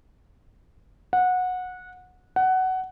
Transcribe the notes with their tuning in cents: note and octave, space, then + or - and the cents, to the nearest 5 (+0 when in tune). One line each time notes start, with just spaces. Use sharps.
F#5 -20
F#5 +15